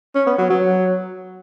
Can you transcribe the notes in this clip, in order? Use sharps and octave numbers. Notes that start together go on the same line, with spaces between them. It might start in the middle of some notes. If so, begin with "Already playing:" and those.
C#4
B3
F#3
F#3